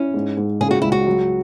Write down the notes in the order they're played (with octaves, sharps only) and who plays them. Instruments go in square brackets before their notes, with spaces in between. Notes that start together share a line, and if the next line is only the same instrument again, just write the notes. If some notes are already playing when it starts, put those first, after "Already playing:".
Already playing: [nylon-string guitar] C#4 [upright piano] E4
[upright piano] G#2
G#2
[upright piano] C#3 [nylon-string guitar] G#4
[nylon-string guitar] F#4
[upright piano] C#2 [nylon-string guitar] E4
[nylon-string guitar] F#4
[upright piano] F#3